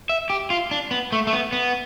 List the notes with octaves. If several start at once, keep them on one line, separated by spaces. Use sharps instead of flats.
E5
G4
F4
D4
B3
A3
A3
B3
B3